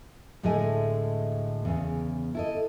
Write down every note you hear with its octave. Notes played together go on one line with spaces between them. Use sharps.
D2 A2 G#3 A3 D#5 G#5
E2 C#3
E4 A4 D#5